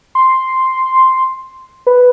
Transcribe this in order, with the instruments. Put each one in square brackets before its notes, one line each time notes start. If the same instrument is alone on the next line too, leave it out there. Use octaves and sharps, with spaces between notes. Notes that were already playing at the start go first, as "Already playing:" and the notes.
[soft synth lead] C6
B4